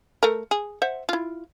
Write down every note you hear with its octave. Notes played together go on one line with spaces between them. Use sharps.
A3 A#4
G#4
C5 E5 F#5
E4 F4